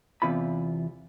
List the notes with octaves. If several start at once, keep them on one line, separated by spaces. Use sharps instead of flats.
E2 C3 F4 B5